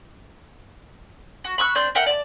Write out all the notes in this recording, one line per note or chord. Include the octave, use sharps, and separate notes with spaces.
F#4
B5 C#6 E6 F#6
C4 D4 G6
A#4 E5 F#5 G5
D5 A5